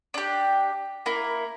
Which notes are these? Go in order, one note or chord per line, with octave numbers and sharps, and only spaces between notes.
D4 G4
A#3 E4